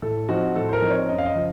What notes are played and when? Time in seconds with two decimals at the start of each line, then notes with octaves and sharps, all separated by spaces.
0.02 A2 A4
0.28 F3 C4 D#4 F#4
0.56 A2 A4
0.69 C5
0.73 A#4
0.81 F3 C4 D#4
0.91 C#5
1.08 F#2 D#5
1.18 F5
1.25 D#5
1.34 C#3 F3